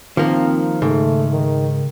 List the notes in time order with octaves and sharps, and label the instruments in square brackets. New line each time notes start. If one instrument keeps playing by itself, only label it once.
[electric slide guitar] D#3 [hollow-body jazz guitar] F3 A#3 [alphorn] C4
[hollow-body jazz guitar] G#2 [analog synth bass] C#3 [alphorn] A3
[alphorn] D#3